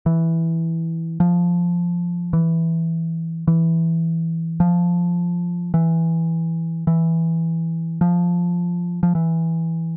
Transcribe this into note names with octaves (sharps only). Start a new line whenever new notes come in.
E3
F3
E3
E3
F3
E3
E3
F3
F3
E3